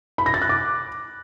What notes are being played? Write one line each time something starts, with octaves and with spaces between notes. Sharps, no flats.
B5
A#6
A6
F#6
D6